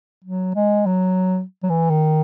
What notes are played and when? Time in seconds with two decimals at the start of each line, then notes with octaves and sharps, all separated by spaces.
0.24 F#3
0.55 G#3
0.86 F#3
1.63 F#3
1.70 E3
1.90 D#3